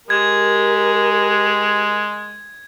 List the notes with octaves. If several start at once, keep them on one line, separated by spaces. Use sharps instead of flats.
G#3 G4 A#4 G#6